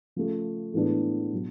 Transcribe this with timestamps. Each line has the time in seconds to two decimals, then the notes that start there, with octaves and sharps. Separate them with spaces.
0.16 C#3 F3 A3
0.74 A2 E3 G#3 B3 D4
1.33 B2 F#3